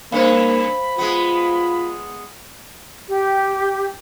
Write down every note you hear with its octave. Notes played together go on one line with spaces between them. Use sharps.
G2 A#3 C#4 C5 F5 B5
G#3 B3 F4
G4